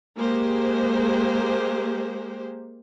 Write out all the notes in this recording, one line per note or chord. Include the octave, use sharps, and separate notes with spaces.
G#3 A#3 G4 C5